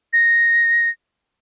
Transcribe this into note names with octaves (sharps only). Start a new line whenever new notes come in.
A#6